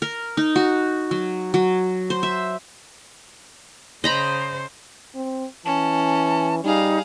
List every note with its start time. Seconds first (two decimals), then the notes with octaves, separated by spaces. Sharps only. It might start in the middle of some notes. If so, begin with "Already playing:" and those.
0.02 A#4
0.37 D#4
0.56 F#4
1.11 F#3
1.54 F#3
2.10 C5
2.23 E5
4.04 C#3 C5 D#5 A#5 B5
5.15 C4
5.65 E3 C#4 A5
6.64 G3 D#4 G#4 F5